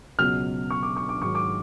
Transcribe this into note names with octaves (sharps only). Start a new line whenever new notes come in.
C#2 B2 F#3 F6
C#6
D6
C#6
D6
G#2 D#3 F#3 C#6
D6